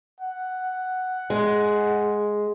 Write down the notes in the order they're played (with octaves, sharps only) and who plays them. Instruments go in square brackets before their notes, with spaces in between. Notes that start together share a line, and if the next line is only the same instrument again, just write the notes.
[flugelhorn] F#5
[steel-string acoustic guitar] G#3